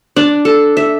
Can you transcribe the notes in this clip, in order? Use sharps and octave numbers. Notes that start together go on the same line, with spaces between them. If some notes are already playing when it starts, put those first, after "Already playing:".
D4
A4
E5